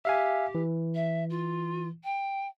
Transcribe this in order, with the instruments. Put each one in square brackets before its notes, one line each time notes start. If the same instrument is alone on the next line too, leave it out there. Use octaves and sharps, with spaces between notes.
[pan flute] G4 [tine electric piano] E5 F5 G#5
[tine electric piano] E3
[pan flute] E5
F4
G5